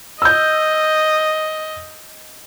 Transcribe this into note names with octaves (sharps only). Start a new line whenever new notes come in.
D#5 E6 G6